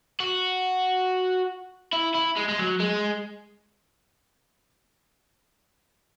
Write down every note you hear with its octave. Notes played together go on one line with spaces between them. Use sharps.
F#4
E4
E4
G#3
G#3
F#3
G#3